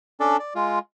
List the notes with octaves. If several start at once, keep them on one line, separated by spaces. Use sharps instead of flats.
C#4 D4 A4 D5
D5
G#3 F4